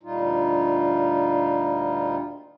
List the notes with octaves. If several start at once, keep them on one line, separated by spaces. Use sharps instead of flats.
D2 A#2 G3 D#4 F4